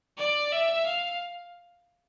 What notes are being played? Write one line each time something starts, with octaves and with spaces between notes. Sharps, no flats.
D5
E5
F5